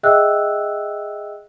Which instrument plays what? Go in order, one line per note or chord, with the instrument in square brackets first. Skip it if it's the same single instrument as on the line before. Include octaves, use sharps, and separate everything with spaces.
[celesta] G#4 D#5 E5 G5 E6 F#6